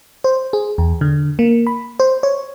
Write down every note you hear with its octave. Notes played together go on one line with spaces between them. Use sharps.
C5
G#4
E2
D3
A#3
B5
C5
C#5